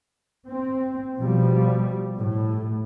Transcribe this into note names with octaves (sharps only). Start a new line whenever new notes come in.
C4
B2 F3 G3
A2